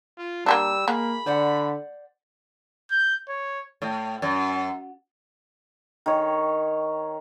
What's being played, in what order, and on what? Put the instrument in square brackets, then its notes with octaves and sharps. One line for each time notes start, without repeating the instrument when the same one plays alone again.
[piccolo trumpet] F4
[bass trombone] G3 [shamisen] A#3 C#4 D4 [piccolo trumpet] E6
[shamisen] G#3 [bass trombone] A#3 [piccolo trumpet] B5
[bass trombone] D3 [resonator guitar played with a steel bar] C5 D5 F#5
[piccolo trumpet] G6
C#5
[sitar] A2
F#2
[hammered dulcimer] D#3 C#5